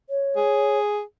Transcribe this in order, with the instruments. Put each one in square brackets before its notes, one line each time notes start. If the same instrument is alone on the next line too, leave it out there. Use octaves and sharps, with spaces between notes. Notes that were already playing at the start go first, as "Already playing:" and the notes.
[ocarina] C#5
[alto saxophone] G#4